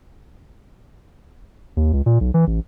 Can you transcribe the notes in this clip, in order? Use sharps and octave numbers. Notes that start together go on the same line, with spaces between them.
D#2
C#2
A#2
B1
E3
A1